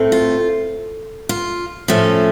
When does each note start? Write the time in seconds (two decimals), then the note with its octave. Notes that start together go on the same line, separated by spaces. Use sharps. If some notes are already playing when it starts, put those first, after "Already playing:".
Already playing: A2 A3 C4
0.12 F4
1.29 F4
1.88 A2 F3 A3 C#4